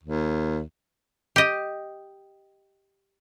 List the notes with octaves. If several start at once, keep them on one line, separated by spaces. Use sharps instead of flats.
D#2
G4 D#5